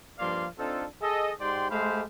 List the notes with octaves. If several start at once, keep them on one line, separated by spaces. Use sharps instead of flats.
G2 F3 A#3 D5 F5 C6
C4 D4 D#4 F4 A4
G#4 A4 D#5
G#2 G4 D5 G5 C6
G#3 A3 G4 C5 F5 B5